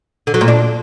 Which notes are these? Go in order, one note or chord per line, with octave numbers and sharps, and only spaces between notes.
D3
F#3
A#2
D4